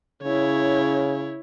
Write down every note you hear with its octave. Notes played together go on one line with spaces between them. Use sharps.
C#3 E4 C#5